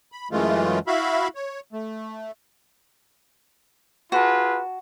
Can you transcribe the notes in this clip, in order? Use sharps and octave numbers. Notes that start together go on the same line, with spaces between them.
B5
F#2 E3 G#3 A3 F4
E4 F#4 E5 F5 B5
C#5
A3
F4 F#4 G#4 B4 A5